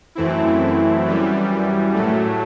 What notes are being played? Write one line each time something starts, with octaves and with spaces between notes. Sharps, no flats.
F#2 E3 A3 C4 E4
F#2 E3 G3
A2 F#3 A3